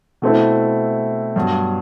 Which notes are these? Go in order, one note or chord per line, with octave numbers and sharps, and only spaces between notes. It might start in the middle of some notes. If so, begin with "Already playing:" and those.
B2 A3 C4 E4
G2 F#3 B3